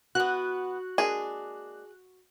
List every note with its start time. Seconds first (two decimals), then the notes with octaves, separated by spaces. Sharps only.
0.15 E3 B3 F#4 F#6
0.98 G#3 A#3 D4 G#4